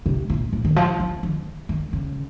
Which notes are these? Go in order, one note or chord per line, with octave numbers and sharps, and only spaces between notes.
C3
A#2
A#2
D#3
F3
F3
D#3
D#3
C#3